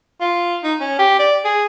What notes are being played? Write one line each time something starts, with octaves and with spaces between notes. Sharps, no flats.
F4
D#4
C#4
G4
D5
G#4